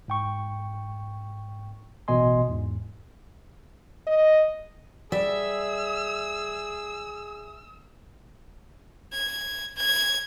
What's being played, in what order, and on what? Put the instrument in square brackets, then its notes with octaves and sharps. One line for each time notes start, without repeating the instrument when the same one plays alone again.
[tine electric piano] G#2 G5 C#6
A1 B2 D#5 G#5 C6
E2 G#2
[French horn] D#5
[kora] G3 [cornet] G#4 [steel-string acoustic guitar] E5 [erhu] E6
[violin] G#6
G#6